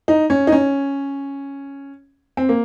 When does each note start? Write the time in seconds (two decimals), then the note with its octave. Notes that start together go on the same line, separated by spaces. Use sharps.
0.08 D#4
0.30 C#4
0.47 D#4
0.52 C#4
2.37 C4
2.49 A#3